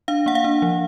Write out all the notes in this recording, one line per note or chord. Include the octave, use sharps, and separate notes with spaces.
D4 F5
A#3 F#5
F5
D4
F3